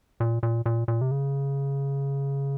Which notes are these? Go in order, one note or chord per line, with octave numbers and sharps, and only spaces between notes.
A#2
A#2
A#2
A#2
C3
C#3